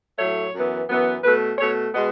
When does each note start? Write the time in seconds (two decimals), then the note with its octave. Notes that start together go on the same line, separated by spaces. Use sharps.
0.18 A2 F#3 A3 C#5
0.53 F#2 E3 B3
0.89 F#2 E3 B3
1.24 B2 A3 B4
1.59 B2 A3 C#5
1.94 B2 G#3 B3 D#5